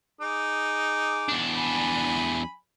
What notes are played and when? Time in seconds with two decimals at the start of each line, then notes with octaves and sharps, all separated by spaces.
0.21 D#4 G#4 D6
1.28 E2 D4
1.54 G#5 B5